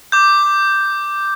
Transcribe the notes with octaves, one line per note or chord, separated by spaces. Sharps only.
D6 G6